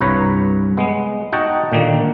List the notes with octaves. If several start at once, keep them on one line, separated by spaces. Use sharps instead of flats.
C2 G2 B4 C#5 A#5
G#3 B3
D#4 F#4 D#5 F#5 G5 A5
A#2 D3 D#3 A#3